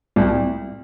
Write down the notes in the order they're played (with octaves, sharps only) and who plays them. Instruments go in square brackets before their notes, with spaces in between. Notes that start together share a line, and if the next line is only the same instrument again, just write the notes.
[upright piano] C2